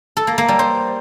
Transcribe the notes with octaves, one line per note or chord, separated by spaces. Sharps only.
A4
A#3
A#3
G3
C5